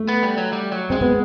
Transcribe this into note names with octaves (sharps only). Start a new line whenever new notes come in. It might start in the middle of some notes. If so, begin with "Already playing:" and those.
Already playing: A3
B3
G3
F#3
G3
F#3
G#3 C4
B3